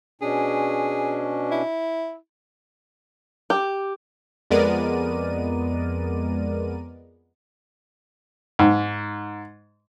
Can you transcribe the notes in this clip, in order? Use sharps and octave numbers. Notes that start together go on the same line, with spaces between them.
B2 C#4 D4 G#4
E4
G4
F2 G#3 B3 A#4 D5 D#7
G#2